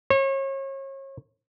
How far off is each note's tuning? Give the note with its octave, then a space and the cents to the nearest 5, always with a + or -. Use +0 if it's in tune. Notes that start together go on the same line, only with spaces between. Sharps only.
C#5 -35